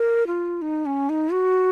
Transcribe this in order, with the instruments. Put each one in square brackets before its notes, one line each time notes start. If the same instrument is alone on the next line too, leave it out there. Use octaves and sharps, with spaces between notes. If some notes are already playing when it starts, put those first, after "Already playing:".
Already playing: [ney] A#4
F4
D#4
C#4
D#4
F#4